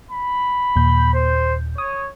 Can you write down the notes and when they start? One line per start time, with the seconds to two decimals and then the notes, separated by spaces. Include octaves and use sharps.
0.11 B5
0.76 D#2 A#2 G6
1.14 C5
1.78 C#5 D#6